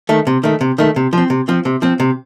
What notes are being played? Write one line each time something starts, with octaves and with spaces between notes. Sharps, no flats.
D#3 A3
C3
D#3 A3
C3
D#3 A3
C3
F3 C4
C3
F3 C4
C3
F3 C4
C3